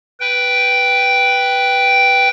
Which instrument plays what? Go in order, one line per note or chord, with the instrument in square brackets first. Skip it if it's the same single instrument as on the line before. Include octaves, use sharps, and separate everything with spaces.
[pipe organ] B4 G5